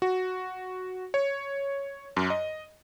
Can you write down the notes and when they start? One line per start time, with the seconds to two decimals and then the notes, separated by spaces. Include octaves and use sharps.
0.02 F#4
1.14 C#5
2.17 F#2
2.30 D#5